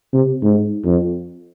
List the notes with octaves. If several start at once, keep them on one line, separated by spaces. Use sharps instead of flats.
C3
G#2
F2